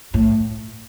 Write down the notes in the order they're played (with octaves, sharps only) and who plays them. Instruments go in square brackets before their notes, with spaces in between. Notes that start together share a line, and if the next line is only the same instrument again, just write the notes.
[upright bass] A2